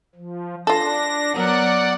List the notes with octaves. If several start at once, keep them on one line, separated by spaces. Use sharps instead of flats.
F3
D4 F4 A4 A#6
F#3 B3 A#4 D5 F#5